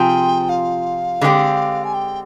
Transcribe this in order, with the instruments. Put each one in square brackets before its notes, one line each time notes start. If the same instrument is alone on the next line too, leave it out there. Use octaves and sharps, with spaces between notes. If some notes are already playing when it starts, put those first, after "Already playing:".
Already playing: [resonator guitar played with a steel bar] C3 F3 C4 F4 G#4 [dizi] G5
[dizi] F5
[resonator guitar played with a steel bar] D3 G#3 C4 G4
[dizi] G#5
G5